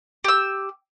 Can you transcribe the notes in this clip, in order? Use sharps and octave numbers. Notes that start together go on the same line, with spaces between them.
G4 E6